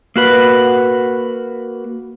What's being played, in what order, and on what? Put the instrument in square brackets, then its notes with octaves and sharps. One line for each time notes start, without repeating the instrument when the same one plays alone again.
[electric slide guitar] A#3 F#4 B4